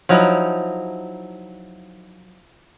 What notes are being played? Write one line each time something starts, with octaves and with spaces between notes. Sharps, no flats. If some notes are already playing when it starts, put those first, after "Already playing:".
F3 F#3 D#4 E4